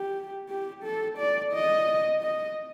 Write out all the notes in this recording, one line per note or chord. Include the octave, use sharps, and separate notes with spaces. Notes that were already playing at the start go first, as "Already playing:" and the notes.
Already playing: G4
G4
A4
D5
D#5
D#5